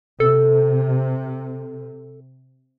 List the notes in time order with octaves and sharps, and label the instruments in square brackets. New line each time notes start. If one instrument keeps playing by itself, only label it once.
[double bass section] C3 [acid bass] A4